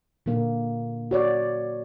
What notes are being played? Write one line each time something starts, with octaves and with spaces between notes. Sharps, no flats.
A#2 D3 A#3
F#4 C#5 D5